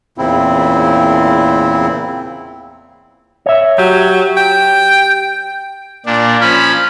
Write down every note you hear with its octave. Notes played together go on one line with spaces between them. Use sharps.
E2 A#2 C#3 C4 E4
C#5 E5
F#3 G4
G5
A#2 D4
F3 C#4 B5